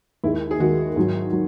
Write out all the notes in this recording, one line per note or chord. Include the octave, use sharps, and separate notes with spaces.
D#2 D#3 G#3 E4
G#4
D#2 D#3 G#3 F#4
G#2 D#3 F#3
F#3